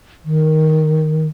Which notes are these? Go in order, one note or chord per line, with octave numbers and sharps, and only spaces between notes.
D#3